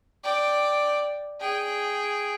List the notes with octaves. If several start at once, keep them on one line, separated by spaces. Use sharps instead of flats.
D5 G5
G#4 G5